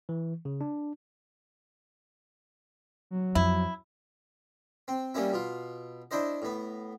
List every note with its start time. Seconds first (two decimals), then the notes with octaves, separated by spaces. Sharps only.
0.09 E3
0.45 C#3
0.61 D4
3.11 F#3
3.35 F2 E4
4.88 C4
5.14 G3 A#3 C#4 E4
5.33 B2 F4
6.11 D4 E4 C5 D#5
6.42 A2 B3